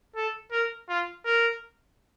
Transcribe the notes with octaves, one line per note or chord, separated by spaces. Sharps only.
A4
A#4
F4
A#4